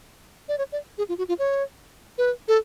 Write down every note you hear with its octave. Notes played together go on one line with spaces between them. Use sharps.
D5
C#5
D5
G#4
F4
F#4
F4
C#5
B4
A4